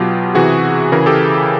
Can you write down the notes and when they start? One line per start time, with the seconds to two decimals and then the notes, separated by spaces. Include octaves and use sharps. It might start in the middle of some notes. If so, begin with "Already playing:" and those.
Already playing: B2 F#3 F4 G4
0.35 C3 E3 F#4 G#4
0.92 C#3 E3 G#4 A#4
1.06 G4 A4